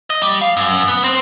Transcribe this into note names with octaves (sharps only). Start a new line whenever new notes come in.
D#5
G3
F5
F#2
B3
C4